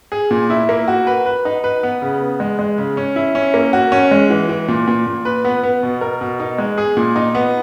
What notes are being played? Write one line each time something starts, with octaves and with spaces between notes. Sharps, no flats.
G#4
A#2
E4
A#3
F#4
B4
B4
D#4
B4
B3
C#3
B3
G#3
G#3
C#3
C#4
E4
C#4
A#3
F#4
C#4
G#3
E3
E3
A#2
A#2
A#2
B4
B3
B3
B2
A#4
B2
D#4
G#3
G#4
A#2
D#4
B3